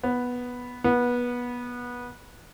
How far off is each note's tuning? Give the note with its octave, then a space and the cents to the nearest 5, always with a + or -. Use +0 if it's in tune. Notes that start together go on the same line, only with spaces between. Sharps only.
B3 -5
B3 -20